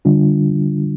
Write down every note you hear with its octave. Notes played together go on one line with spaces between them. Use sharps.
D3 G3 D4 F4